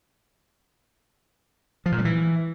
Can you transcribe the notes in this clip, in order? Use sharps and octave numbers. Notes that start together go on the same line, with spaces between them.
F3
A#2
G3
E3